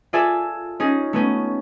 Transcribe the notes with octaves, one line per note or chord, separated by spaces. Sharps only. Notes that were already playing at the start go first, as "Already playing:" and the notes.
F4 G#4 A4 D5 E5 G#5
C#4 D#4 G#4
A3 B3 C#4